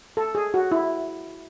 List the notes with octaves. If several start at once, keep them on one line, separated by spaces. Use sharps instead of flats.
A4
G#4
F#4
E4